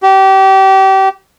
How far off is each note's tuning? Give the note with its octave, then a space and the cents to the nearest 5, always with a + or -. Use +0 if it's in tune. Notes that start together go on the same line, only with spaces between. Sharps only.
G4 -30